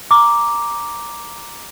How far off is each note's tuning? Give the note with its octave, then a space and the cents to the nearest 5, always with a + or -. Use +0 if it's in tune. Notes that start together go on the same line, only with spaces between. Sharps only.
A#5 +0 D6 +0